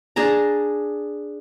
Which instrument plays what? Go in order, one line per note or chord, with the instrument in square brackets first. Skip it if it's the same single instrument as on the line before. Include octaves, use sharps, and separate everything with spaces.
[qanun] D4 G#4 A5 A#5